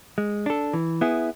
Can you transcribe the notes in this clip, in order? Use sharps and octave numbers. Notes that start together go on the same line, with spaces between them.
G#3
D4 A4
E3
B3 E4 G#4